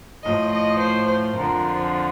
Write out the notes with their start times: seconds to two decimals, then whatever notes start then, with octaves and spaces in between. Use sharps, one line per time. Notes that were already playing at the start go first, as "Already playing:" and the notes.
0.24 A2 F3 D#5
0.52 D#5
0.80 C5
1.08 C5
1.36 F2 D3 F3 A#4